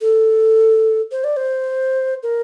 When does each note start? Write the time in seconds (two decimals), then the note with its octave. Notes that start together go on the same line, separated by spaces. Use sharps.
0.01 A4
1.12 C5
1.24 D5
1.37 C5
2.23 A#4